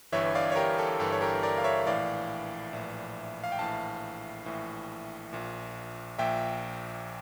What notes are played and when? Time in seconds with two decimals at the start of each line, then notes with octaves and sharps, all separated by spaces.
0.12 G1 G2 E3 C#5 E5
0.35 D5 F5
0.52 C#5
0.56 G4 A#4
0.78 A4
0.99 G1 G2 E3 A4
1.12 C#5
1.21 G4 A#4
1.43 A#4 D5
1.58 F5
1.64 C#5 E5
1.86 A#1 A2 E3 D5 F5
2.73 A#1 A2 E3
3.44 F5
3.52 G5
3.59 A#1 A2 E3 F5 A5
4.46 A#1 A2 E3
5.33 A#1 A#2
6.19 A#1 A#2 E5 G5